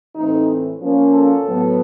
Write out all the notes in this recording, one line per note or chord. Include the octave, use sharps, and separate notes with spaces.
A2 E3 A3 C4 D#4
F3 A#3 C#4
A4
A2 F#3 B3